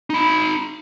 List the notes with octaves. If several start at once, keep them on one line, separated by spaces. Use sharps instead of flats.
D#4 B5